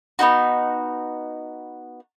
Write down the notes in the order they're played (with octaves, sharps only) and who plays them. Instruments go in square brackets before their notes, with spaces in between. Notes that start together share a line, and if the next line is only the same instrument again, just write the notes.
[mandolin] B3 D4 D#4 F#4